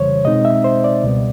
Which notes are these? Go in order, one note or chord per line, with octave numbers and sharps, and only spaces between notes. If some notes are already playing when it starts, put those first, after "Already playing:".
Already playing: F2 C#3 E3 G3 C5 C#5
B2 G#3 C4 D#4 D#5
E5
C5
D5
C#2 B2 G3 B3